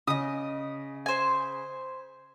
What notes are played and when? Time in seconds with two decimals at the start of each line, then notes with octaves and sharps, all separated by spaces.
0.07 C#3 D#5 D#6
1.06 C5 G#5